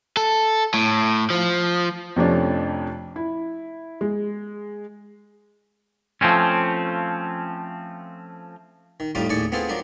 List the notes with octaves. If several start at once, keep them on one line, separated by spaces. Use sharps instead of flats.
A4
A2
F3
F2 C3 F3 A3 C#4 D4
E4
G#3
F3 A3 C4 C#4
D#3
F2 A2 G3 D#4 F4 D6
D#2 A2 G#4 D5 A5 C#6
B3 C4 F4 G#4 A4 C5
F3 F#3 D4 A#4 F5